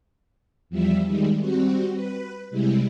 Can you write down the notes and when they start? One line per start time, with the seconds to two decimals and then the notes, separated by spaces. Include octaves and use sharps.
0.70 E2 F3 G3 E5
1.06 D#3 G3 G#3
1.40 G3 C4 F#4
1.93 B4
2.50 C3 G3 G#3 E4